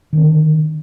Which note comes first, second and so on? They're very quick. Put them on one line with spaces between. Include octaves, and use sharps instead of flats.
D#3 C4 D3 D4